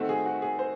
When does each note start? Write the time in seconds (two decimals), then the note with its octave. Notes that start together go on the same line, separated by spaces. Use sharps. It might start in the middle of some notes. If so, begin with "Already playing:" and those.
Already playing: D#3 A3 C4 F#4
0.09 G#4
0.26 F#4
0.42 G#4
0.59 C5